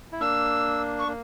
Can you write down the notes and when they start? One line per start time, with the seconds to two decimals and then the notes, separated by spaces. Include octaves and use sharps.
0.12 E4
0.20 A#3 D4 E6
0.99 C#6
1.08 A#3